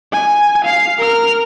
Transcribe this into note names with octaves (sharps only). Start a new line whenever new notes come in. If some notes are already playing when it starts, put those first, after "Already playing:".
G#5
F5 C7
A#4 F6